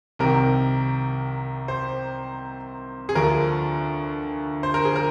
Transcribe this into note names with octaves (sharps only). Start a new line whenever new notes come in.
C2 C3 D#3 A#4
C5
G#4
D2 D3 F3 A#4
C5
A#4
G#4
A#4